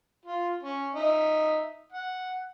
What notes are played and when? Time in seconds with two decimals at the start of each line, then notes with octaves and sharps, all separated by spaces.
0.26 F4
0.63 C#4
0.95 D#4 E5
1.92 F#5